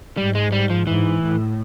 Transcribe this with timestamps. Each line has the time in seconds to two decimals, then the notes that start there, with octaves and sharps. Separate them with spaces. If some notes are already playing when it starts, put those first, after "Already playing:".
0.17 G#2 G3
0.35 G#3
0.52 G3
0.70 F3
0.87 G#2 E3
1.22 A2